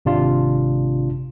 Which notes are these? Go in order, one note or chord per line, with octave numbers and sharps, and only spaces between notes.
G#1 C3 D4 F4